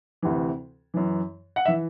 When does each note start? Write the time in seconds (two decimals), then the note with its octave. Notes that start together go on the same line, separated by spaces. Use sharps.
0.22 D2 C3 E3
0.94 F#2 E3
1.56 F#5
1.65 E3 E5